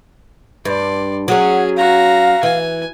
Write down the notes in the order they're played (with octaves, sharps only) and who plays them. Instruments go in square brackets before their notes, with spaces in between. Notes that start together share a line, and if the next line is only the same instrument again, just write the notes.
[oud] G2 [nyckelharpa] D5 C6
[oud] F#3 C#4 [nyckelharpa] G#4 [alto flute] F#5
[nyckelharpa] F#4 A#5 [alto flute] F5
[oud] E3 [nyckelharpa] G#5